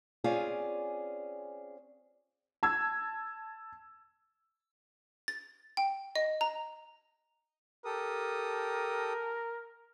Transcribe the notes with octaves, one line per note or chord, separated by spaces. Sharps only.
C4 C#4 F4 G#4 D5 G#5
A5 E6 G#6
A6
G5
D#5
A#5
G4 A4 A#4 D#6